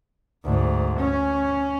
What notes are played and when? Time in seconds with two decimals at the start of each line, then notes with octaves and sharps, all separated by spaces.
0.44 D2 G#2
0.99 C#4